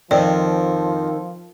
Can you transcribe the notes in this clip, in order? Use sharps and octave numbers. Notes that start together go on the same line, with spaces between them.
F2 D#3 F3 D5 G5